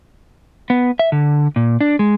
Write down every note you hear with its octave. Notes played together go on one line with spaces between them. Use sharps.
B3
E5
D3
A#2
D4
G#3